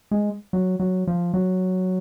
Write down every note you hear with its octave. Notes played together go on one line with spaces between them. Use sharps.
G#3
F#3
F#3
F3
F#3